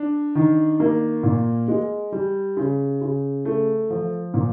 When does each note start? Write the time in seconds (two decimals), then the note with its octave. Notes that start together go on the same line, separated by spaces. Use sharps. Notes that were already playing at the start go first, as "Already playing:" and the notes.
Already playing: D4
0.35 D#3
0.80 A#3
1.23 A#2
1.68 G#3
2.12 G3
2.57 C#3
3.01 C#3
3.45 A3
3.90 F3
4.34 A#2